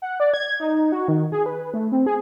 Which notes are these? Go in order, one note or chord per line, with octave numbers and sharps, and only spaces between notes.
F#5
D5
G#6
D#4
F#4
D#3
G#4
B4
A3
C4
G#4